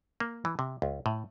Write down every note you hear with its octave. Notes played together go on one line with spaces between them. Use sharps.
A#3
E3
C3
C#2
A2